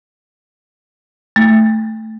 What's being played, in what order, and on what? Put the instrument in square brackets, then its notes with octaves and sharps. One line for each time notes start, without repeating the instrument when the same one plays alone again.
[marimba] A3